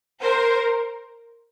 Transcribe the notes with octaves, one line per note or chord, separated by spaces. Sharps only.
A#4 C5